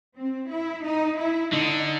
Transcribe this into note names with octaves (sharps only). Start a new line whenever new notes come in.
C4
E4
D#4
E4
D3 D#4